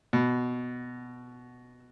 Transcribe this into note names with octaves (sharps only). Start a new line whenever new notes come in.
B2